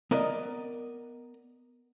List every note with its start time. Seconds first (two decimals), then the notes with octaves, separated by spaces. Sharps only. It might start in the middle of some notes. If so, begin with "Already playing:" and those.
0.11 B3 A#4 D5 D#5